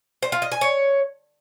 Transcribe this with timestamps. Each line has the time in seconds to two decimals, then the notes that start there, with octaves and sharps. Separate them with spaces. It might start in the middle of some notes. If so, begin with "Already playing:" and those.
0.22 C5
0.32 F4
0.42 D#5
0.52 G#5
0.61 C#5